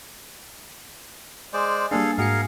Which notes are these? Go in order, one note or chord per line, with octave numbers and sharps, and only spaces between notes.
G#3 C5 D5
G3 A#3 D4 G#4 A4 F5
G#2 F#4 G#4 A#4 F5 C#7